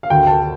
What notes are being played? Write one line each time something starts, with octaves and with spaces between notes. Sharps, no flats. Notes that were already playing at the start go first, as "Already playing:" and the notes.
F5
D2 G5
A5